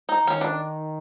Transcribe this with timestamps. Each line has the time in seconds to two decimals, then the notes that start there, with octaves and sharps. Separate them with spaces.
0.09 D#4
0.27 D#3 C#4
0.41 D4